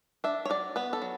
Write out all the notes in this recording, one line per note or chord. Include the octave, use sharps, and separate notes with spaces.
D4 E5
C#5
F#3 D5
B3 B4
A4
F#3